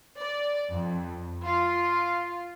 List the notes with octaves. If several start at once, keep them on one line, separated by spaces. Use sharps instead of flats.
D5
F2
F4